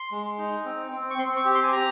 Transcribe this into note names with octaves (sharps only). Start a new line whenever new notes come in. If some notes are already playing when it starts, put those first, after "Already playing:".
Already playing: C6
G#3
D#4
C4
C4
C#6
C4 C6
C#6
G4
C6
G#5
G4 A#5